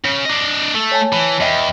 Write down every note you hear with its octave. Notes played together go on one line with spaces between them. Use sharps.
C#3
D4 D#5
A3
C#5 G#5 A5
E3
E2 D#5 E5 G5